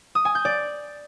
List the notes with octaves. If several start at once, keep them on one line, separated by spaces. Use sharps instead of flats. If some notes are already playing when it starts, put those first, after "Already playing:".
D#6
G#5
G6
D5